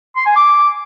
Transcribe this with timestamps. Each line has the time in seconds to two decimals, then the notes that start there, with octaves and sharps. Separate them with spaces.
0.16 C6
0.26 G#5
0.36 D6